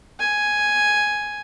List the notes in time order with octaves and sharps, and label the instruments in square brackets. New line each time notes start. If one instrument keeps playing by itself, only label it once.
[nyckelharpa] G#5